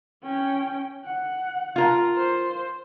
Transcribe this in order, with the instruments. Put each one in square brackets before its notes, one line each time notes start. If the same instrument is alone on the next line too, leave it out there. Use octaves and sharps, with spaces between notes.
[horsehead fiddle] C#4 G5
F#5
[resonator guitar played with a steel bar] F4 A#4
[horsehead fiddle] C5